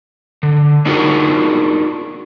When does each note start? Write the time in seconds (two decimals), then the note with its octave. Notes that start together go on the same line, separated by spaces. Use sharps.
0.43 D3
0.85 D4 D#4 F4 F#4 G#4 A#4